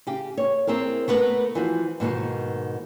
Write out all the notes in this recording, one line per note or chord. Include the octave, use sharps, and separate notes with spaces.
C#3 G4
C#5
C4 E4 G#4 A#4
A3 B3 A#4 B4
E3 F3 F#4
G#2 B2 D3 D#3